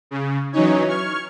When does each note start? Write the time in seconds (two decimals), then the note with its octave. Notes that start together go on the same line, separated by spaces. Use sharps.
0.11 C#3
0.53 E3 F#3 C#4 D#4 C#5
0.88 C#6 F6 G#6